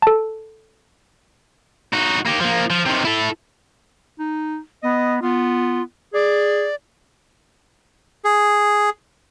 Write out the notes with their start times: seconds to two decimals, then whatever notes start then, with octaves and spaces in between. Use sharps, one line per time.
0.02 A4 A5
1.93 D#4 F#4
2.25 A#3 G4
2.40 F3 A#3
2.70 F3
2.86 C3 D#3
3.05 E4 A4
4.19 D#4
4.83 B3 D#5
5.22 B3 F4
6.14 G#4 D5
8.24 G#4